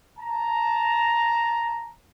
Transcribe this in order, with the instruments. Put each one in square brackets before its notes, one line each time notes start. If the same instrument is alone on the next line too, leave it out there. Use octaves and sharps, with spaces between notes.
[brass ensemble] A5 A#5